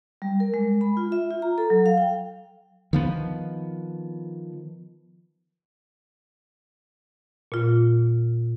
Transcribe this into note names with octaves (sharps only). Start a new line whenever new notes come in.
G3
A#4
G#3
B5
F4
E5
F4
A#5
A4
F#3
F5
G5
D#3 F3 B3
A#2 F4